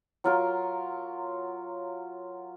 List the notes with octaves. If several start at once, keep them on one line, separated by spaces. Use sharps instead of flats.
F#3 F4 A#4